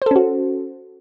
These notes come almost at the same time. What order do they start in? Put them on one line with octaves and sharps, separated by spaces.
C5 A4 C#4 F#4